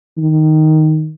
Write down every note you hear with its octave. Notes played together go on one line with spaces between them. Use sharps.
D#3